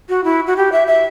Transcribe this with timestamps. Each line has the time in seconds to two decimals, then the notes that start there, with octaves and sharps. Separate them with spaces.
0.09 F#4
0.24 E4
0.47 F#4
0.57 G4
0.72 E5
0.87 E5